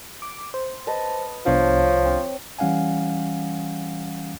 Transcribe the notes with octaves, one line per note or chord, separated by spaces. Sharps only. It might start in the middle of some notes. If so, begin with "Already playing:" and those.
D6
C5
B4 D#5 A5
C2 F3 B3 D4 C#5
C4
E3 G3 C#4 F5 F#5 G#5